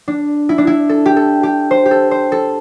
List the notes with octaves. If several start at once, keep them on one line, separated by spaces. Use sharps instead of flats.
D4
E4
D4
E4
A4
G4
A4
G4
C5
G4
A4
C5
A4